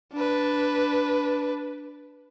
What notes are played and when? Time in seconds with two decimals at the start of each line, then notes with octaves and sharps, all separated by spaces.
0.13 D4 B4